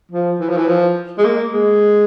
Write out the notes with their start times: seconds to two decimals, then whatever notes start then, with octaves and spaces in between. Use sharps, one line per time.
0.12 F3
0.40 E3
0.49 F3
0.57 E3
0.68 F3
1.18 G#3
1.25 A#3
1.53 G#3